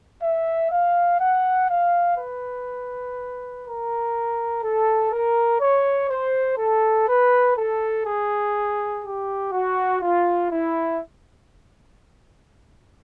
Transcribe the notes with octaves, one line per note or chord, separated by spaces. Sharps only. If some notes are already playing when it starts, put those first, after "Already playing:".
E5
F5
F#5
F5
B4
A#4
A4
A#4
C#5
C5
A4
B4
A4
G#4
G4
F#4
F4
E4